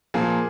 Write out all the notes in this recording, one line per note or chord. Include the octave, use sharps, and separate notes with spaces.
A#2 F3 A#3 G#4